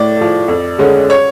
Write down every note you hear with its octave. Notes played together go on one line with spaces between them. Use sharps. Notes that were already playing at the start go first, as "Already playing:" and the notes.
Already playing: A2 D5
F3 A3
F2
D3 G#3 C#4
C#5